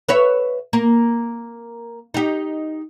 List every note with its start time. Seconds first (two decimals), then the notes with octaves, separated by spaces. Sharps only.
0.09 B4 C#5 E5
0.73 A#3
2.14 D#4 G4